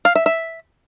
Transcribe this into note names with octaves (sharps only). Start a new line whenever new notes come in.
F5
E5
E5